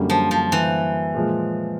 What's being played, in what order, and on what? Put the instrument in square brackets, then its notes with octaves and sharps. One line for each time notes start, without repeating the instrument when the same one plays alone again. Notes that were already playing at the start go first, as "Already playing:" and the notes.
Already playing: [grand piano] F#2 D3 G3 A#3
[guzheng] F3
F3
E3
[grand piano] A#2 F3 G#3